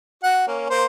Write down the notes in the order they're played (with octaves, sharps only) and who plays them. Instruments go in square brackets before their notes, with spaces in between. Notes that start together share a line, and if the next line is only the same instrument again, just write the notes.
[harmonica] F#4 F#5
A#3 C#4
A#3 C5